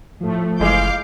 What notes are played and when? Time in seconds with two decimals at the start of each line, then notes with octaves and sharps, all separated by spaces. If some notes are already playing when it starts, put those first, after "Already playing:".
0.20 A2 F3 A3
0.60 F#1 E3 G#3 G#4 F5 D6 G6